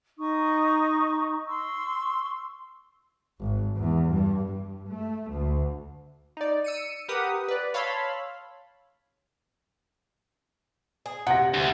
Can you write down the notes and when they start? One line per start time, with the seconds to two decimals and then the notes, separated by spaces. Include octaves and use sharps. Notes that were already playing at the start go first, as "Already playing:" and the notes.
0.19 D#4 C#6 D#6
1.46 C6 C#6 E6
3.40 G#1
3.76 E2
4.10 G2
4.45 G2
4.88 A3
5.31 D2
6.37 D#4 D5
6.64 E6 C#7 D#7
7.08 G4 A#4 B4 F#5 D#6
7.48 B4 D5
7.74 C#5 F5 A5 B5 C6 E6
11.06 G#4
11.27 C3 F#5 A#6
11.54 D2